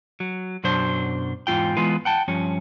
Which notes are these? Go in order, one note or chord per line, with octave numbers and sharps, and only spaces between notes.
F#3
F#2 B2 F#3 D4 C5
E2 G#2 G#3 F4 G5
E3 G#3 B3 F4 B4
F#5 G5 A5
G2 F3 C#4